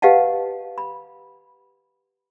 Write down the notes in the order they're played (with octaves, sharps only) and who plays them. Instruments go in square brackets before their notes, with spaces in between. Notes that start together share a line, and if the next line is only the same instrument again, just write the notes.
[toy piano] G4 B4 D#5 F5 F#5 A5
B5